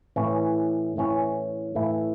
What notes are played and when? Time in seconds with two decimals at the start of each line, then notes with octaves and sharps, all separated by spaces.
0.16 A2 E3 C#4
0.96 A2 E3 C#4
1.75 A2 E3 A3 E4